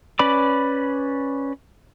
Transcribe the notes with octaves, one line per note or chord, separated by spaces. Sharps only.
C#4 B4 D5 B5 D6